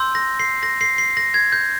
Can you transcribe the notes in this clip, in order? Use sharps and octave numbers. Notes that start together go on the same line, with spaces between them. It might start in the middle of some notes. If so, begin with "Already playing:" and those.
Already playing: C6 E6 G6
A#6
C7
A#6
C7
C7
A#6
G#6
G6